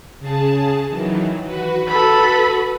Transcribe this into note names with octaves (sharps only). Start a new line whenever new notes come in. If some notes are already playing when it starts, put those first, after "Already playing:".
C#3 G#4 A5
D#3 E3 F#3
F#4 B4
A4 B5